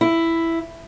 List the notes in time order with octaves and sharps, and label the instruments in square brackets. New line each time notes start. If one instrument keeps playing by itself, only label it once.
[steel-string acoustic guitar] E4